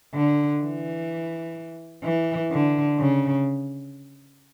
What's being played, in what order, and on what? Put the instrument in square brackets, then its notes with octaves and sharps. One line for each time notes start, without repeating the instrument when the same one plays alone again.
[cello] D3
E3
E3
D3
C#3